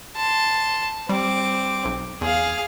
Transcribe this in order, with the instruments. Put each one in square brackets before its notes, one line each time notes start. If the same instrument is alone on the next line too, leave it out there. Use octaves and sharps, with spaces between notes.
[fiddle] A5 C6
[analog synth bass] G3 [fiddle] C4 D6
[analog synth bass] B1
[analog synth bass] E2 [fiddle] G#4 F5